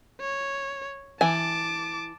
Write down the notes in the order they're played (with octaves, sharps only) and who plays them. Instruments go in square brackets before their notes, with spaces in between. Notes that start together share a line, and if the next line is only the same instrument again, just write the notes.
[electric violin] C#5
[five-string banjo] E3 G#5 [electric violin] A5 D6